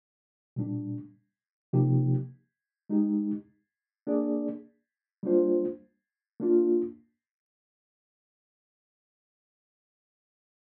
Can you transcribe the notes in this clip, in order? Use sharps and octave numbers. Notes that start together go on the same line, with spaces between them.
A#2 G3 D4
C3 F3 A#3 D#4 G4
G#3 D#4 G4
A#3 D4 G#4 D5
G3 A#3 D4 F4 C5
A#3 D4 F4